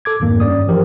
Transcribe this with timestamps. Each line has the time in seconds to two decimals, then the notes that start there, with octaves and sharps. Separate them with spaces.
0.05 A4 D6 G#6
0.20 F2 G#2 D#3 A#3
0.40 G2 C#4 D5 D#6
0.67 E3 F3 G4 A#4 C5